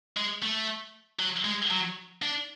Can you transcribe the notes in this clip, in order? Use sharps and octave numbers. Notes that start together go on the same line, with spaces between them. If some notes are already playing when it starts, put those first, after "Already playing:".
G#3
A3
F#3
G#3
F#3
D4